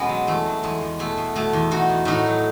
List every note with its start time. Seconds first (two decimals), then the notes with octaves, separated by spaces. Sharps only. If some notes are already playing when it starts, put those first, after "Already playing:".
Already playing: B2 G#3 B3 C#4
0.09 F#3
0.27 E2 A3
0.46 F#3
0.63 E2 G#3
0.81 E2
0.99 B2 A3
1.17 B2
1.35 B2 A3
1.53 E2
1.71 E2 D#4 F#4
1.89 E2
2.05 A2 D#4 F#4
2.26 F#3